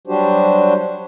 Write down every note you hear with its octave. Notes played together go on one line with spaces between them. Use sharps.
F#3 G3 D4 F#4 G4 C5